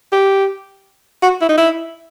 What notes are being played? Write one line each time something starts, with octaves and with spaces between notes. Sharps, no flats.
G4
F#4
E4
D#4
E4